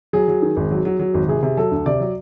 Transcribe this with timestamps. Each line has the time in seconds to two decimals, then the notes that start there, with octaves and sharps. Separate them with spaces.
0.13 F#3 G#4
0.28 F#3
0.42 D#3
0.57 G#1
0.71 F#3
0.85 F#3
1.00 F#3
1.14 G#1
1.28 C3 G#4
1.43 C3
1.57 F#3 A4
1.71 D2
1.86 C3 D5
2.00 F#3